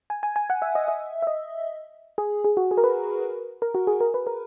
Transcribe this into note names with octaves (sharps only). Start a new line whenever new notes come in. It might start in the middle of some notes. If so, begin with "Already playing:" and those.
G#5
G#5
G#5
F#5
E5
D#5
E5
E5
D#5
G#4
G#4
F#4
G#4
A#4
B4
A#4
F#4
G#4
A#4
B4
A#4